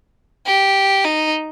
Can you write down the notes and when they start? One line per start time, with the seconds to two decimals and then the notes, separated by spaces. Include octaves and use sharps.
0.46 G4
1.05 D#4